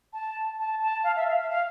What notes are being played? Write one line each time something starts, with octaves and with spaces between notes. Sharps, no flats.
A5
A5
A5
F5
E5
F5
F5
F5